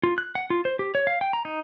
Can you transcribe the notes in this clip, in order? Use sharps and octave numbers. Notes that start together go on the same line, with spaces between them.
F4
F#6
F#5
F4
C5
G4
C#5
F5
G5
A#5
D#4